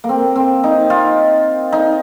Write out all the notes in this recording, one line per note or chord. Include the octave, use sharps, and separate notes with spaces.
A#3
C4
C4
D#4
F4
D#4